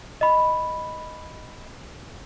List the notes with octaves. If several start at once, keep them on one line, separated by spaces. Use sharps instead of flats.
D#5 B5